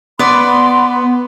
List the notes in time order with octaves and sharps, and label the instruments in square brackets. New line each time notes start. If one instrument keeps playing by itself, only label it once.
[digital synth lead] B3 [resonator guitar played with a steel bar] B4 D5 [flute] C6